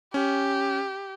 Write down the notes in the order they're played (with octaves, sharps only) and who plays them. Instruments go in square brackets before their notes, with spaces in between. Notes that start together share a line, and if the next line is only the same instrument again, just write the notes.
[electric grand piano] C#4 [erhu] G4